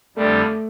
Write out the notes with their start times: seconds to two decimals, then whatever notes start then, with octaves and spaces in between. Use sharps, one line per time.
0.16 F2 D3 G3 A3 D4